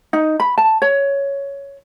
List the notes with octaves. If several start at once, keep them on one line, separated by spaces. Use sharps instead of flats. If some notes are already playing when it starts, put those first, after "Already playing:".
D#4
B5
A5
C#5